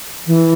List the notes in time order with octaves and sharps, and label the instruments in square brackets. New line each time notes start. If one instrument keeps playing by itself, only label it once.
[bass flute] E3